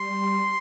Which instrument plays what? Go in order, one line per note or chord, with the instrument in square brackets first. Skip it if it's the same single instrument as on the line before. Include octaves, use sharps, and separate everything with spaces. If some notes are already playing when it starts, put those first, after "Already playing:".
Already playing: [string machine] G3 [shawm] C6